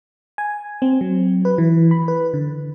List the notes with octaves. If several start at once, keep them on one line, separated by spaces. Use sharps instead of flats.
G#5
C4
F#3
B4
E3
B5
B4
D3